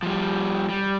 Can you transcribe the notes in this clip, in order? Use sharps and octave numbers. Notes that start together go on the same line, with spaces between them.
F3 G3
G3